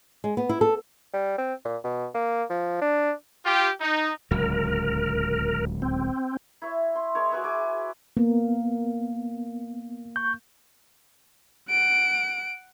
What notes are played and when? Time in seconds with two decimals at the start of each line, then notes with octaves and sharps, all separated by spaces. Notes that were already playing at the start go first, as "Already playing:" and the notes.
0.24 G#3
0.37 B3
0.49 E4
0.61 A4
1.14 G3
1.38 C4
1.65 A#2
1.84 B2
2.14 A#3
2.50 F3
2.82 D4
3.46 F4 G4
3.81 D#4
4.31 D1 C#2 F#3 A#4
5.82 C4
6.62 E4 C#5
6.95 C6
7.15 G#3 A#4 C#5
7.31 F#4 G#4 B4 E5
7.44 G#4 G#5 D6
8.17 A#3 B3
10.16 C#6 G6
11.70 F#5 D7